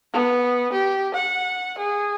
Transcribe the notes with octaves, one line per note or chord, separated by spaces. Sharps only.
B3
G4
F#5
G#4